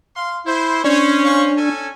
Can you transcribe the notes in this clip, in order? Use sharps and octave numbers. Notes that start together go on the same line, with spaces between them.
F5 C6
E4 C5
C#4 D4 C5 C#5
C5 F5 C#6
C#4 A4 G#5